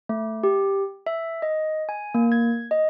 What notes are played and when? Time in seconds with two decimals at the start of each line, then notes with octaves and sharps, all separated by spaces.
0.09 A3
0.43 G4
1.06 E5
1.42 D#5
1.89 G#5
2.15 A#3
2.32 G#6
2.71 D#5